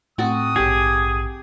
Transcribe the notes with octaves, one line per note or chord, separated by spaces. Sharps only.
A2 C4 F#4 A4 D#6
A#1 G#2 G4 G#4